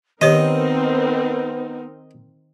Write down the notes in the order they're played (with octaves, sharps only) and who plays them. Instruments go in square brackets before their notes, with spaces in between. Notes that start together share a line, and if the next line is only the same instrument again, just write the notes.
[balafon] D#3 G4 C#5 [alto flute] B3 [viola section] C4 D#4 A#4 [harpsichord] D#5